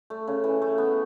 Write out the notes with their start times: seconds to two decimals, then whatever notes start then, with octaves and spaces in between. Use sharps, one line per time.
0.10 A3
0.28 C#3
0.44 E3
0.62 A3
0.78 B3